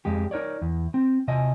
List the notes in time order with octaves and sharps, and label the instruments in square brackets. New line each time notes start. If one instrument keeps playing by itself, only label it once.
[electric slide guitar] F2 G#3 G4
D#4 A#4 C#5 D5
E2
C4
C3 D#5 G#5